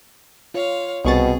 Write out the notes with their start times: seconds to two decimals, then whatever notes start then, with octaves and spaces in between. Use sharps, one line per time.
0.54 F4 C#5 F5
1.05 C2 B2 B3 C4 G#4 C#6 A6